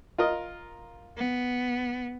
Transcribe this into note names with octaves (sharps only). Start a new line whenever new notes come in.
F4 A#4 D#5
B3